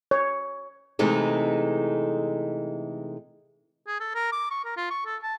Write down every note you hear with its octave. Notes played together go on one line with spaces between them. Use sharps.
C#5
C3 E3 G#3 A3 D#4 A4
G#4
A4
A#4
D6
C#6
A#4
F4
C#6
A4
A5